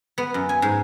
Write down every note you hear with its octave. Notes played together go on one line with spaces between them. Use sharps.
B3
F#2
G#5
G#2